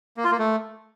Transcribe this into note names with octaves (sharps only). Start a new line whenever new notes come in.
A#3
F4
A#3
A3